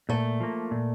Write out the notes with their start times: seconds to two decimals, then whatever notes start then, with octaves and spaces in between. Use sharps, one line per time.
0.09 A#2 A3
0.40 F3 A#3
0.71 A#2